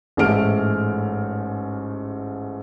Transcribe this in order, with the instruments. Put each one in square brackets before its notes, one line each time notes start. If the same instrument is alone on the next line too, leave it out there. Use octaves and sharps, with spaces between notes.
[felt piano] A1 G#2 A3 F6 D7